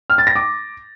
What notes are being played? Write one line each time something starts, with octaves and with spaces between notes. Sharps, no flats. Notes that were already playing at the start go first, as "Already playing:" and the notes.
F6
A6
A#6
D6